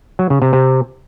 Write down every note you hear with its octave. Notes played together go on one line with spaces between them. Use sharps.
F#3
C#3
C3
C3